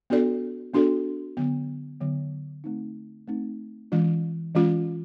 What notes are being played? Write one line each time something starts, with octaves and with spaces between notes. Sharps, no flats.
B3 D4 F#4 A4 D5
B3 D4 F#4 A4 D5
D3 F#3 B3
D3 F#3 B3
A3 C4 D#4
A3 C4 D#4
E3 G#3 C#4 F4
E3 G#3 C#4 F4